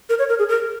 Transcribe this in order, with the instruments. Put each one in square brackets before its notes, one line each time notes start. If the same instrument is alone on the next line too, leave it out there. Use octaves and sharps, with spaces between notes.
[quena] A#4
C#5
A#4
G#4
A#4